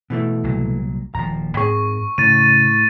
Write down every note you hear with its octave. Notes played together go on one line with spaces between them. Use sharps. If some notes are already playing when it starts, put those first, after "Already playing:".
B2 E3 A3
C2 A#2 F#3
D#1 F3 A#5
G#2 C4 G#4 C#6
A2 C#3 A6 D#7